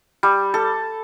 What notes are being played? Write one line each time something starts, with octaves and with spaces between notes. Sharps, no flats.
G3
A4